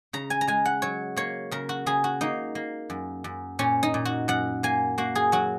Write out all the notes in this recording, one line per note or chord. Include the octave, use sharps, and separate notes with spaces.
C#3 A#5
G#5
A#5
G#3 G#5
F#5
F#3 C#5
A#3 C#5
C#3 A#4
F#4
C#3 G#4
F#4
A#3 D#4
A#3
F#2
F#2
A#2 C#4
D#4
A#2
F#4
F#2 F#5
A#3 G#5
A#3 F#4
G#4
F#3 F#4